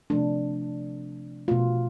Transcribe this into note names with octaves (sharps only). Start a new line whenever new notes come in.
C3 F3 A3 D4
B2 A3 F4